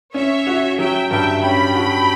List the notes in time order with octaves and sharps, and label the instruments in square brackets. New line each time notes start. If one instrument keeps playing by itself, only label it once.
[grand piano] C#4 [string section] C#5 E5
[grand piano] F#4
[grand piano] F#3 [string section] E5 G5
[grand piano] G2 [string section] E5 G5
[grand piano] C#4 [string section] G5 B5
[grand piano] F#4